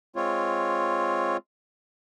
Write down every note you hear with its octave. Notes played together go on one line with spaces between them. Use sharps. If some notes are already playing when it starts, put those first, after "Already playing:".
G#3 C4 F4 C#5